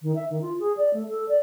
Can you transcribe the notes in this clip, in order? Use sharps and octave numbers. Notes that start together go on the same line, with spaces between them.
D#3
E5
D#3
F4
G#4
D5
A3
A4
D5